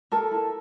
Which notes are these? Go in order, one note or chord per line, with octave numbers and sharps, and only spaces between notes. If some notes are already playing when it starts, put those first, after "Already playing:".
A4 A#4 A5
E4